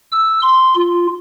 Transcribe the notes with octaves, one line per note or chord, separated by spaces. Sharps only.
E6
C6
F4